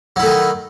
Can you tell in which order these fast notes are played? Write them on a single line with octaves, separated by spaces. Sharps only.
F#3 E4 A3 D#3